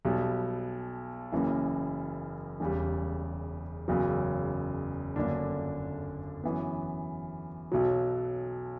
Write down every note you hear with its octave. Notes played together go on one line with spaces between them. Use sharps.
B1 B2 G3
F#1 F#2 E3 A#3
E1 E2 C#3 G3
F#1 E2 C#3 F#3
G1 F#2 D3 A#3 D4
F#2 E3 B3
B1 B2 F#3